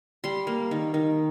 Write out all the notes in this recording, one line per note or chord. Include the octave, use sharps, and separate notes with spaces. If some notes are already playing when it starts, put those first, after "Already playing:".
G3 C6
A#3
D#3
D#3